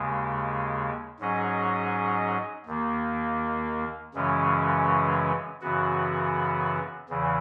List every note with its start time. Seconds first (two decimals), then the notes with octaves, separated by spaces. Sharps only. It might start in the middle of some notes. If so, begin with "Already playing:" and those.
Already playing: D#2 C#3 G#3
1.20 G#2 F#3 C#4 G#4 D#5
2.67 D#2 D#3 A#3
4.14 F#2 C#3 E3 G#3 C#4
5.61 F#2 C#3 E3 B3 F#4
7.09 E2 C#3 E3